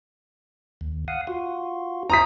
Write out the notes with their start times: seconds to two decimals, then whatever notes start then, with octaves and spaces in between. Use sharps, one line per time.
0.81 D#2
1.08 F5 F#5 D#6
1.27 F4 F#4
2.10 E4 A#5 D#6 B6